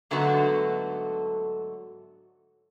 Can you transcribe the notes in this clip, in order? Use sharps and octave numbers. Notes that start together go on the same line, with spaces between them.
G#2 D3 F#3 A3 B3 F#4